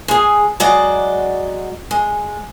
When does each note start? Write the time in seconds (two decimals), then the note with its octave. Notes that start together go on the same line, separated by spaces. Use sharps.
0.08 G#3 G#4
0.60 F#3 G#3 F#4 D5 D#5
1.91 G#3